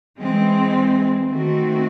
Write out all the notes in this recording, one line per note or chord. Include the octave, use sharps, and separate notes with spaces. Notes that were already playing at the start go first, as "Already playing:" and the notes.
E3 G#3 C4
D#3 A3 C4 F#4